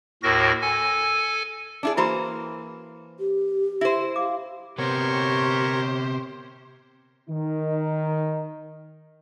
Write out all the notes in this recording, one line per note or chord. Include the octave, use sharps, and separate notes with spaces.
D#2 A2 F#4 A#4 A#6
A4 G#5
D4 E4 G#4
E3 A#3 E4 F#4 C5 B5
G4
E4 C5 E5
F5 D6
C3 B3 G4 A#4 C5 C#5 C#6
D#3 D#4